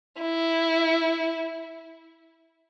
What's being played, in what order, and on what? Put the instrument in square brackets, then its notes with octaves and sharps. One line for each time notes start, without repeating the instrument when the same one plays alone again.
[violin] E4